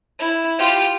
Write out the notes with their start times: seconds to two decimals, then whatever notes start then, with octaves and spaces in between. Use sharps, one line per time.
0.19 E4
0.58 F4 G4